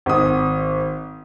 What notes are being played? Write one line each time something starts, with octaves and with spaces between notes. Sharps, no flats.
G#1 D#6